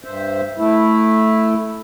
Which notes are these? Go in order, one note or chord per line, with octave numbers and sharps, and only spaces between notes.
G2 C5 E5
A3 E4